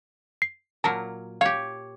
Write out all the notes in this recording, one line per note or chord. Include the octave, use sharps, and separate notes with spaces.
C7
A#2 F#3 A#4 A5
G4 C#5 F5